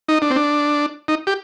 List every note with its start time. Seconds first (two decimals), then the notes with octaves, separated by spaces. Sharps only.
0.08 D#4
0.22 D4
0.30 C4
0.36 D4
1.08 D#4
1.27 G4